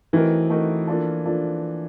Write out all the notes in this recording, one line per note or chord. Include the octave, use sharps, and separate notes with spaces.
E3 A3 C4 D#4 F#4 A#4
A3 C4 D#4 F#4 A#4
F3 A#3 D4 F4 A4
F3 A#3 D4 F4 A4